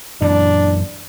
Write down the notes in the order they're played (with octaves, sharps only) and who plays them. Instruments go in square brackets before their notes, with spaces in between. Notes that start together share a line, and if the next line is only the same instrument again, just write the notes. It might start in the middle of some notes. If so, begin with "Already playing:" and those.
[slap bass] F#2 A#2 E3 [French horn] D4